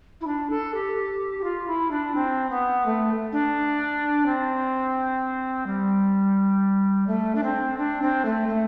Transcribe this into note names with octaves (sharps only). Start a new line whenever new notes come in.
E4
D4
A4
G4
G4
F4
E4
D4
C4
B3
A3
D4
C4
G3
A3
D4
C4
D4
C4
A3
A3